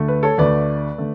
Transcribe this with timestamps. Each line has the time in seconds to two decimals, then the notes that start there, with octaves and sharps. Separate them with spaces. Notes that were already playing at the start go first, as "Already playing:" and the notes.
Already playing: D2 D3 A3
0.08 B4
0.23 A4 C#5
0.38 D2 D3 A3 B4 D5
0.98 D3 A3